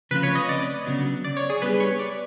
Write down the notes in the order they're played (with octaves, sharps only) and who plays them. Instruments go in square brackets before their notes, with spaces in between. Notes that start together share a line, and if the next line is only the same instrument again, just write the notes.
[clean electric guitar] C#3 F3 A3 C4 F4 [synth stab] B4
[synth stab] C#5
D#5
D5
[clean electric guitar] C#3 F#3 B3 D4 F#4
[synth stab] D5
C#5
G#4
[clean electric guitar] G3 B3 D4 [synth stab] B4
[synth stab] C#5
D5